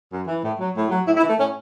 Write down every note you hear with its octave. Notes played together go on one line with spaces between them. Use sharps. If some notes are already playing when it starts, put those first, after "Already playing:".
F#2
E3
A2
F#3
A2
F#3
A2 E4
E4
E3
A3
A2 C#4